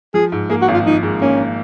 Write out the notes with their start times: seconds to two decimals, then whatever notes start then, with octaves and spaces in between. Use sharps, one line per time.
0.14 F3 G#4
0.32 G#2
0.50 A#3 G#4
0.62 F#4
0.68 G#1
0.74 F4
0.86 F3 D#4
1.03 G#2
1.22 A#3 C#4